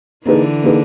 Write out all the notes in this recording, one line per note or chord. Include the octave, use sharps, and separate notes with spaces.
D3 E3 A#3 D#4 G#4 B4
A#3 D#4 G#4 B4